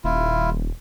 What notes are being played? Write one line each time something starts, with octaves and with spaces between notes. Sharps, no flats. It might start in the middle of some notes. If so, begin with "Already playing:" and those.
D#1 E4 F4